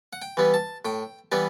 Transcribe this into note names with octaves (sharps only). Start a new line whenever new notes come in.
F#5
G5
E3 G3 B3
A5
A2 G5
E3 G3 B3 D5